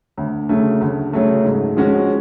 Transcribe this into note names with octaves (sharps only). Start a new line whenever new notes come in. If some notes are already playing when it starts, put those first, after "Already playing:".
D2
C#3 F#3 A3
D2
C#3 F#3 A3
G#2
F3 G#3 C#4 F#4